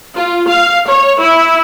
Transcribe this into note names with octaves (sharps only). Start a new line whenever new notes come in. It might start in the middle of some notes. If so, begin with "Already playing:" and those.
F4
F5
C#5
E4